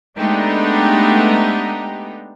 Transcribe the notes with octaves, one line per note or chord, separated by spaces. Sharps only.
G#3 A3 B3 D4 D#4 G4